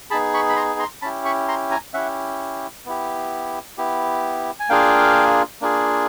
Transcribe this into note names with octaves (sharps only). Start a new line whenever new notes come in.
B3 D#4 G#4 A5 B5
B5 C#6
B5
A#5 C6
A#5 C6
C#4 E4 G4 A5 B5
B5 C#6
A#5 C6
G#5 A#5
C#4 E4 G4 E5 F#5
B3 E4 G4
B3 E4 G4
G#5
A#3 D4 F4 G#4 F5 G5
A#3 D4 F4 G#4